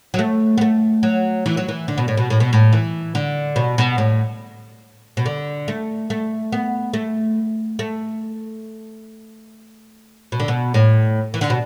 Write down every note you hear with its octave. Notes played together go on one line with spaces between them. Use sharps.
F#3
A3
B3
A3
F#3
E3
F#3
E3
D3
B2
A2
B2
A2
B2
A2
E3
D3
B2
B2
A2
B2
D3
A3
A3
B3
A3
A3
B2
D3
B2
A2
E3
D3
B2